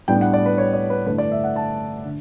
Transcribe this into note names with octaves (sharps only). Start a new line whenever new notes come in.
A2 G3 B3 D4 G5
F#5
D5
B4
C#5
D5
B4
G2 D3 A3 E4 B4
D5
E5
F#5
A5
D3